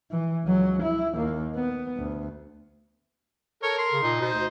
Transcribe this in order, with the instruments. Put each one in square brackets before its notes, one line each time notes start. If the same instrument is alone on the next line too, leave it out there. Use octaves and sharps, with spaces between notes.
[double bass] E3
C#2 F#3
E4
D#2 A#3
B3
D2
[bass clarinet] A4 [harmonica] A#4 [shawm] C#5
[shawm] C6
[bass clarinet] C#3
[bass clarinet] A#2 [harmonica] D#4
[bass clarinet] B2 [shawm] C5
[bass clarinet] D2